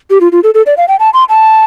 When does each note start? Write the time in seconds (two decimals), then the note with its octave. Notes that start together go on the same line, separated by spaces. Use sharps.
0.10 G4
0.21 F4
0.32 F4
0.44 A4
0.54 A4
0.66 D5
0.77 F5
0.88 G5
1.00 A5
1.14 C6
1.29 A5